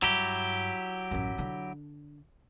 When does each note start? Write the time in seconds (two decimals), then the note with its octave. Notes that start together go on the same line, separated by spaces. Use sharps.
0.02 G2 F#3 E4 G4
1.11 A1 F#2
1.38 D3 D4